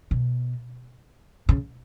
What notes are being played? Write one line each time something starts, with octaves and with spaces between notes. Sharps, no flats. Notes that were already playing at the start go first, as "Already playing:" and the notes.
B2
C#3